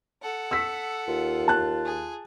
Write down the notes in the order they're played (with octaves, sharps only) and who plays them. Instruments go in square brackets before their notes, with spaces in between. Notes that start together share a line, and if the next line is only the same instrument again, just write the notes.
[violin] A4 F#5
[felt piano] E6 B6
[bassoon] D#2 [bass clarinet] F4
[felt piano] A5 F#6
[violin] G#4